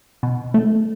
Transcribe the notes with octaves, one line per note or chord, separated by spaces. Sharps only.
B2
A3